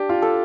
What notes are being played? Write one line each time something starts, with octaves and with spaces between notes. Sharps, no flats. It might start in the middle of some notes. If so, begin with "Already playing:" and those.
Already playing: D4 G4
F4
A4